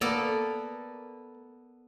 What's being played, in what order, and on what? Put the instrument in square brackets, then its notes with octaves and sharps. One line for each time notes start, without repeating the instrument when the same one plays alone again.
[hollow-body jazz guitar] A#3 [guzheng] B3 A4 D5